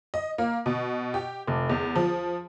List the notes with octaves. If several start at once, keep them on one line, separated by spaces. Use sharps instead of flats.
D#5
A#3
B2
G4
F1
E2
F3